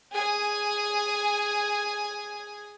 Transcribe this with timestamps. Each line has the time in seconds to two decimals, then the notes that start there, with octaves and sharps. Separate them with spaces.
0.12 G#4 G#5